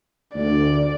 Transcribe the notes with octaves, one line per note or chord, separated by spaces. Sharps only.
D2 D5